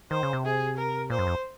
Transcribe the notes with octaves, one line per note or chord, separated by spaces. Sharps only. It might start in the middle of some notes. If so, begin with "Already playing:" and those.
D#3 C5
C#3
C3
G#4
A#4
A#2 C5
F#2
F2